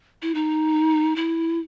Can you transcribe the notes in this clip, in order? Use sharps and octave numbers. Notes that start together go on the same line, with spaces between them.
E4
D#4
E4